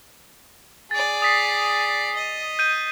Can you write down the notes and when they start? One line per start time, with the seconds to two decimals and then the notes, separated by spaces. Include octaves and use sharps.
0.91 G#4 D5 A6
1.22 D#6 B6 C7
2.16 D#5
2.59 G6 D#7